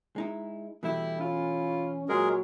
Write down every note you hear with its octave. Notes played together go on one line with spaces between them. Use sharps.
G#3 D#4 E4
B2 E3 G3 A3 E4
C#4 E4 F4
A#2 F#3 G#3 F#4 G#4 A#4